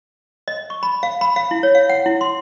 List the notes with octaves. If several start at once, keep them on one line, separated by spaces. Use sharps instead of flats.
D#5
C#6
B5
F5
B5
F5
E4
C#5
F5
F#5
E4
C6